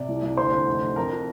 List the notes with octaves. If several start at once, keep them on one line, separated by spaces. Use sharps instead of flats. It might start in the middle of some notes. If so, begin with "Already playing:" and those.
Already playing: C3 D5
C2
C2
D2 C5 C6
D2
F1
F1
F2 A#4 A#5
F3